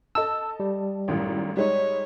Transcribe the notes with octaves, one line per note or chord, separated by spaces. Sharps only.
A4 D#5 A5 E6
G3
G#1 F#2 A2
G3 G#3 D#4 C#5